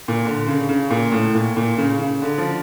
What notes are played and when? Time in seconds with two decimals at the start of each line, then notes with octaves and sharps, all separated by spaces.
0.08 A#2
0.25 D3
0.47 C#3
0.69 C#3
0.90 A#2
1.12 A2
1.35 A#2
1.57 A#2
1.78 C#3
1.99 C#3
2.22 D3
2.38 F3